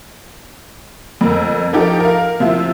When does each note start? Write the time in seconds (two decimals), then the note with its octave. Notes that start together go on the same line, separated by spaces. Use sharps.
1.21 F2 A#4
1.73 F3 D#4 G4 A4 A#4
2.00 A#4 F5
2.40 C3 F3 E4 F4